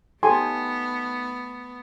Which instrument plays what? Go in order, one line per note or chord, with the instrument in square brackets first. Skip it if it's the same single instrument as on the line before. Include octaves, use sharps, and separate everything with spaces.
[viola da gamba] A3 B3 [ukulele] D#4 G4 A4 [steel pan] G#5 [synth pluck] C6